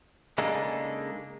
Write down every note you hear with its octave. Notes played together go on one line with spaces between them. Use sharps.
C#3 G#3 A#3 D4 D#4 A4